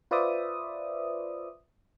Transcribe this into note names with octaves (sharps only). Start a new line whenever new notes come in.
F4 B4 C5 D5 E5 D#6